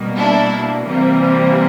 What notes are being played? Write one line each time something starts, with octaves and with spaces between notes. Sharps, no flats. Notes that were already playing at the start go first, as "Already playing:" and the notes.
Already playing: B2 G3 A#3
D4 E4
C3 E3 G3 A#3